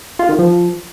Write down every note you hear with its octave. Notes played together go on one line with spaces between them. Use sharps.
F4
D#3
F3